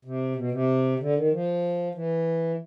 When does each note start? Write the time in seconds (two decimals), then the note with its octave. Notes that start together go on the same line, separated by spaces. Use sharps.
0.05 C3
0.35 B2
0.51 C3
1.00 D3
1.15 D#3
1.31 F3
1.95 E3